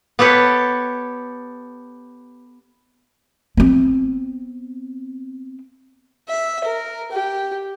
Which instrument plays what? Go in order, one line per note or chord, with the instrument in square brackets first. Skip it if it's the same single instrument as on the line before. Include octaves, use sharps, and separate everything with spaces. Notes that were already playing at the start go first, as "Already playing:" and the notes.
[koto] B3 G4 A4 B4 C#5
[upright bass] B3 C4
[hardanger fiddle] E5
A#4
G4